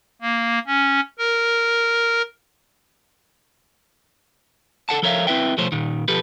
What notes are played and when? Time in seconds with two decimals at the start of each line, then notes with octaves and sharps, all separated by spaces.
0.21 A#3
0.67 C#4
1.18 A#4
4.89 A4 F#5 A5
5.03 F3 A4 A#4 C#5 E5 F5
5.27 C4 E4 B4 E5 G5
5.57 C2 B2 F3 A3 C5 C#5
5.72 A#2 D#3
6.08 B2 F3 G4 A4 B4